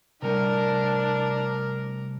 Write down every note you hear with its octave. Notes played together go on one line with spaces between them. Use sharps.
C3 G3 A3 D4 A#4